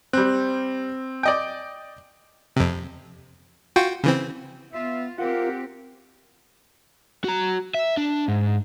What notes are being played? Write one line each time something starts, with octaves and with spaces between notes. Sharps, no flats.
G3 C4 F#6
D5 D#5 G5
F2 C3
F4 F#4 G5
C#3 E3 C4
B3 F4 E5
C4 F4 G4 A#4 F#5
F#4 A#5
E5
D4
G#2